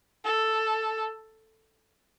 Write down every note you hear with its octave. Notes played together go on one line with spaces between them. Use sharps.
A4